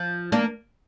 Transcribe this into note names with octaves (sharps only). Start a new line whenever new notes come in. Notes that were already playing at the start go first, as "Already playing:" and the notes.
Already playing: F3
A#3 D4